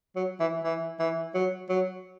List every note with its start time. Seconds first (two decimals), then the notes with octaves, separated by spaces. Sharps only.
0.16 F#3
0.39 E3
0.64 E3
0.99 E3
1.34 F#3
1.69 F#3